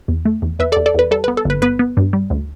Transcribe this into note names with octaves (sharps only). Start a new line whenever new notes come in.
E2
A3
E2
E2 B4 E5
E2 A4 D5
A4 D5
E2 B4
G3 A4
B3 B4
A4
G1 B4
B3 B4
B3
G2
G3
D2